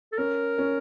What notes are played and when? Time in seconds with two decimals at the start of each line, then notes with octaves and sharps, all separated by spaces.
0.13 A4
0.18 C#4 A#4
0.58 C#4